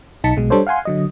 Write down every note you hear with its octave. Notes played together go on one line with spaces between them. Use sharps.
B1 D#4 A5 B6 C#7
B1 B2 G#3
G3 D4 A4 C5 C#5
F5 F#5 G#5 C6
D3 F#3 D#5